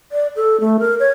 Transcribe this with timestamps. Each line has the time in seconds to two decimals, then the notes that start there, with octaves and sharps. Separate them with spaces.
0.12 D5
0.36 A4
0.60 A3
0.79 A#4
1.00 C#5